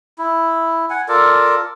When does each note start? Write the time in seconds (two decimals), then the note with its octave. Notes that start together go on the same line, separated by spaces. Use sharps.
0.19 E4
0.90 F#5 G#5
1.08 F4 A4 A#4 D5